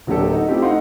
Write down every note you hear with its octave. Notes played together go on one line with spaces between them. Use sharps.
D1 F#3 A#3 D4 G4 A4
D#4 F#4
A3 C4 E4 F4 G4 A4
D#4 F5 F#5 C6